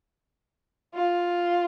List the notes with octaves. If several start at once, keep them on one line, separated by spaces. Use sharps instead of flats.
F4